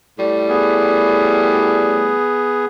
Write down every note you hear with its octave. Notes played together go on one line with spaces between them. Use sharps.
A2 G3
B3 G#4